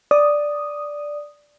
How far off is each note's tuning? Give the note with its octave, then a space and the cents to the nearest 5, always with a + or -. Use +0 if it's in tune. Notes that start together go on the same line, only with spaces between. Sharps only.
D5 +0 D#6 -5